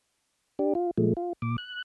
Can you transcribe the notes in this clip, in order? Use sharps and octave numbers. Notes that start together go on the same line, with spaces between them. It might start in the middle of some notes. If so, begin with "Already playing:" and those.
D4 G4
F4
A#2 F3 G#3 A3
F4
A#2 D6
F#6